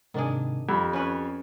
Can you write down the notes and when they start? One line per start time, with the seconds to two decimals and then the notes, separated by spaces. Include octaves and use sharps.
0.14 G#2 C3 D#3 D4 G#4
0.69 F2 G4 B5
0.93 C#4 B4 C#5